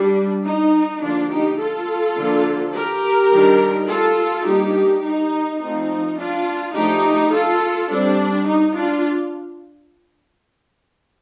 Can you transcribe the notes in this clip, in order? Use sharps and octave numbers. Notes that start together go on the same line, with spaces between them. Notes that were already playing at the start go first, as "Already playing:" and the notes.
Already playing: G3 D4
D#4
D3 F3 A#3 D4 F4
D#4 G4
F4 A4
D3 F3 A#3 D4
G4 A#4
D#3 G3 D4
F4 A4
G3 A#3 D4 D#4 G4
D#4
F3 A3 C4 D#4
D4 F4
F3 A3 D4 D#4 G4
F4 A4
G3 C4 D4
D#4
D4 F4